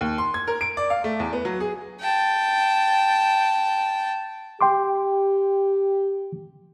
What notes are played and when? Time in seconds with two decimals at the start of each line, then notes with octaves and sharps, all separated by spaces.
0.01 D#2
0.18 C6
0.34 G#6
0.47 A#4
0.61 D7
0.77 D5
0.90 F5
1.04 A3
1.20 E2
1.33 B3
1.45 F#3
1.60 G#4
2.00 G5 A5
4.61 G4 G5 C6 D6